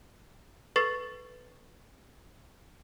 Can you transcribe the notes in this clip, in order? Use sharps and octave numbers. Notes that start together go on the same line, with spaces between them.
A4 B4 C#6 A6 C7